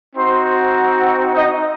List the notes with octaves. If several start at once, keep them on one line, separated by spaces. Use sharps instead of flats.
C4 D#4 F#4 C5 C6
D#4 D#5